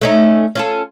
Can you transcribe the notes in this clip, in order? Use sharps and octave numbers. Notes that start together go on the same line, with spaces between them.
A3 C#4 D#4
C#4 F4 A4